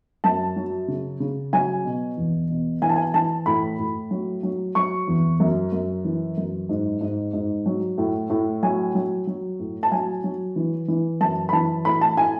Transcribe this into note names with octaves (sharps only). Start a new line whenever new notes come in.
F#2 A5
F#3
C#3
C#3
F#3 G#5
B2
E2
B2
E3 G#5
A5
G#5
E3 A5
A2 B5
A2
F#3
F#3
F#3 C#6
E2
F#2
F#2
E3
F#2
G#2
G#2
G#2
F#3
A2
A2
F#3 G#5
F#3
F#3
A2
A5
F#3 G#5
F#3
E3
E3
F#2 A5
B5
E3 A5
A2 B5
A5
A2 G#5